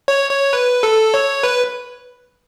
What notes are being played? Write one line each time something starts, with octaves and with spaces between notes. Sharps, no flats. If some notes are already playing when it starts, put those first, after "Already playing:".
C#5
C#5
B4
A4
C#5
B4